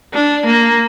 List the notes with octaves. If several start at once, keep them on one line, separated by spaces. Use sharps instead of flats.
D4
A#3